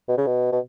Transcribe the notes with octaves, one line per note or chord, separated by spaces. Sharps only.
B2
C#3
B2
B2